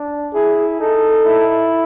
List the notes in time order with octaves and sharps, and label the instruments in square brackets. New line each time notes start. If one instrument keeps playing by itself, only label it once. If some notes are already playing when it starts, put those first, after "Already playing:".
Already playing: [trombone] D4
[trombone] E4 [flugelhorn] G#4
[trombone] D#4 [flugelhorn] A4
[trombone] E4